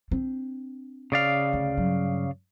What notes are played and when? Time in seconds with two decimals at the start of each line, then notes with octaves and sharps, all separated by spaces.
0.11 C4 D4
1.12 C#3 D5 F5
1.53 D2
1.78 G2 F#3